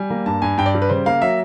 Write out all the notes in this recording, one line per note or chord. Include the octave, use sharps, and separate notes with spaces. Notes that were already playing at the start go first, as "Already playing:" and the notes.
Already playing: G3 G#5
A#3
G2 A5
G2 G#5
G2 G5
D5
G3
B4
C#3 C5
A#3 F5
F#3 E5